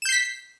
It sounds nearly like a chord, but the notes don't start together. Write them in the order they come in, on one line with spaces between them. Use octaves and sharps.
E7 G6 C7 B6